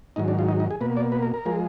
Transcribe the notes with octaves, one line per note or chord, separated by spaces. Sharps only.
G#2 D#3 F#3 D#4
D4
F4
D#4
D#4
G#4
B2 A#3 B4
D5
B4
A#4
A#4
F3 G#3